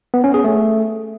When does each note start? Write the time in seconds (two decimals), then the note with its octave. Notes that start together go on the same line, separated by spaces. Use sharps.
0.14 B3
0.24 C#4
0.34 G#4
0.44 A3